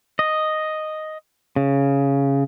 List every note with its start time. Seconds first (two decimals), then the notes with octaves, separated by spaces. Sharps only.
0.19 D#5
1.56 C#3